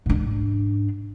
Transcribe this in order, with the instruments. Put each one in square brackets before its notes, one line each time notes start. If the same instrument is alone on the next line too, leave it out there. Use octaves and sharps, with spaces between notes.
[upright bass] G#2 D4